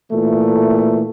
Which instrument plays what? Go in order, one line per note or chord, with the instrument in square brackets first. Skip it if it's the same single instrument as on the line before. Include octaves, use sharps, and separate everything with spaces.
[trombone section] A#2 E3 A3